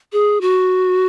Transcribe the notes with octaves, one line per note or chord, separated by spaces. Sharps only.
G#4
F#4